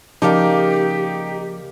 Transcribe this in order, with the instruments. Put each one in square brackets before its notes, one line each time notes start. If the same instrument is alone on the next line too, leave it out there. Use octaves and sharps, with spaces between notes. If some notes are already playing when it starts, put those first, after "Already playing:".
[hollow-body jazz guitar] C#3 F3 A5 [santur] A#3 D5 [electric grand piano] D#4 [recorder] G4